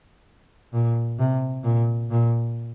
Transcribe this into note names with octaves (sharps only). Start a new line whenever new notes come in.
A#2
C3
A#2
A#2